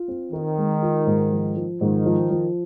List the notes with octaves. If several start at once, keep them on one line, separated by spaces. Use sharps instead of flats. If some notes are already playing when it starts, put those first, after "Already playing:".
Already playing: F4
C4
D#3 A#4
G#3
F4
G#2
F3
F3
G#2 D#3
F3
F3